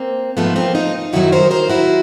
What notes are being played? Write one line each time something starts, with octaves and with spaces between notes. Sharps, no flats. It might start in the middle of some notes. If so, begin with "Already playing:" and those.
Already playing: A#3 C4
G#2 F3 A3 B3
A#3 C4
D#4 F4
F#2 D#3 F#3 E4 F#4
A#4 C5
A#4 C5
E4 F#4